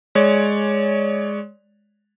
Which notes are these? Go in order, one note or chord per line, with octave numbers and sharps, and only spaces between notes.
G#3 C#5 D5